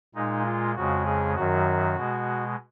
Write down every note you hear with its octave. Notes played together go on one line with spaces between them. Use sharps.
A#2 G#3 D#4
F4
F2 C#3 G#3 F#4
G#4
F#2 D#3 F#3 F#4
B2 G#3